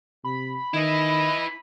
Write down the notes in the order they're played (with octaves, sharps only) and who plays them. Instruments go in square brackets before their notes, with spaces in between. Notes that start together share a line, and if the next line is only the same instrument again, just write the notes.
[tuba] C3 [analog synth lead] B5
[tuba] D#3 [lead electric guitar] E4 B4 [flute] D#5